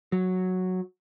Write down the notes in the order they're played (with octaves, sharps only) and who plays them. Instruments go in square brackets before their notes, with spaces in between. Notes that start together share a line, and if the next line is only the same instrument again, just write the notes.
[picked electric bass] F#3